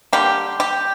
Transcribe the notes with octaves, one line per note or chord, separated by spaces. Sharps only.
D3 G3 A#3 G4
G4